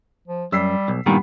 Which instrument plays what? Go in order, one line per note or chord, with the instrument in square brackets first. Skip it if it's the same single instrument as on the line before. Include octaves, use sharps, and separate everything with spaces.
[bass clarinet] F3
[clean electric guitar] F#2 [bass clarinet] G3 [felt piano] E6 B6 C7
[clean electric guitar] B1
[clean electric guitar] G2 A#2 D#3 [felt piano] G3 [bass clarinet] B3